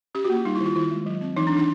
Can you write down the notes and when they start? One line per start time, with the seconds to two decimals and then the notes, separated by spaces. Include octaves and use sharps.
0.15 C#4 G4
0.25 F#4
0.30 A#3
0.35 F4
0.45 G3 D#4
0.55 E4
0.60 D#3
0.66 F4
0.75 D#3 E4
0.91 G#3
1.06 F#3
1.21 C4
1.36 E3 D#4
1.47 D4
1.52 E3 D#4